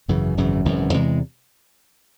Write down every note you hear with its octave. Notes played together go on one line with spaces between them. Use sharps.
G#1 F#2 C#3 E3
G#1 F#2 C#3 E3
G#1 F#2 C#3 E3
E2 C3 E3 G#3